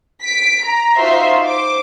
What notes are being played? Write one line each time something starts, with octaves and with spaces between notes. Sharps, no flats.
B6 D7
A#5
D#4 F4 F#4 C5 E5 C6
C5 D6